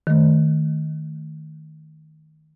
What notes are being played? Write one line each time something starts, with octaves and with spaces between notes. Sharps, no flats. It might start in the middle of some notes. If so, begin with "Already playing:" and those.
D#3 A3